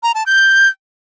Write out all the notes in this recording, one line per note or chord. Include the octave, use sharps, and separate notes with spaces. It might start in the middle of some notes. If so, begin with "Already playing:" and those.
A#5
A5
G6